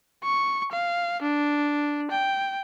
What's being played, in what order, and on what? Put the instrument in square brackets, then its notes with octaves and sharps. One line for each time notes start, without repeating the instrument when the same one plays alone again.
[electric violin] C#6
F5
D4
G5